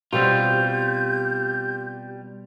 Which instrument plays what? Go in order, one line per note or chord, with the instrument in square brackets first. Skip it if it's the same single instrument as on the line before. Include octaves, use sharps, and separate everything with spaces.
[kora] B2 C4 [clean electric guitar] G3 F4 [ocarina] G4 [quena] G6